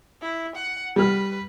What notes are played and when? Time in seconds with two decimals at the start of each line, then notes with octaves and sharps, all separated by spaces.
0.21 E4
0.55 F#5
0.96 G3 B4 F6